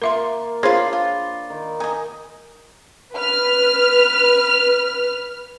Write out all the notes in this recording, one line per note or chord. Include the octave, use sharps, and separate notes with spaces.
A#3 F4 A#4 E5 C6
D4 F4 G#4 C5 C#5 B5 C6
F4
D#3
D#4 D#5 G#5
B4 F6